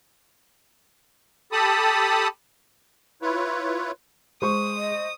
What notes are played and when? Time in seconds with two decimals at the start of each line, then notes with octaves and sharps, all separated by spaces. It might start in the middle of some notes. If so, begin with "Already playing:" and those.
1.52 G4 A4 A5 B5 D#6
3.22 E4 F4 B4 C#5
4.42 G#3 C5 C#6 D#6
4.77 D#5